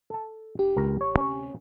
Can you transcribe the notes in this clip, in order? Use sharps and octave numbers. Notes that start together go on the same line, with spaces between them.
A4 A5
E1 D4 G4
C#2 A#4 A#5
A1 C#5
D2 C3 C4 C#4 C#5